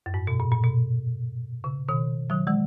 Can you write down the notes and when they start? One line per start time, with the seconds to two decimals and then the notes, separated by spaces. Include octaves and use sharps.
0.06 F#2
0.14 G#2
0.27 B2
0.40 A#2
0.51 A#2
0.64 B2
1.64 C#3
1.88 B2 D#3
2.30 D#3 F#3
2.47 E3 G#3